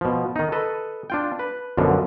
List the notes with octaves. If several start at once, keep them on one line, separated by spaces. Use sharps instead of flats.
B2 F3
D#3 D#4
A4 B4 D#5
D4 F4 G5
B4
F#2 B2 D3 F3